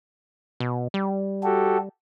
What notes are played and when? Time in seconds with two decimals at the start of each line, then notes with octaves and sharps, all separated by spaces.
0.60 B2
0.94 G3
1.43 F#4 G4 A4